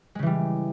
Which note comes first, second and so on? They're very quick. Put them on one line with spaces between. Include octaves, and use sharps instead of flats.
G#3 C#3 E3 G3